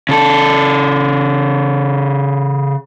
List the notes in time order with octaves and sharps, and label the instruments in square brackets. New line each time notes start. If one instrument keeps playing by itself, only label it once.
[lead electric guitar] C#3 A4